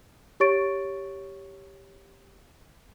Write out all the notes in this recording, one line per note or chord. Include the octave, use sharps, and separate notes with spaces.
G4 C#5 C#6 A6 D7